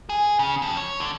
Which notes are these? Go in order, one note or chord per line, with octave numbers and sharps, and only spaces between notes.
G#4
C#3
F2
C#5
D3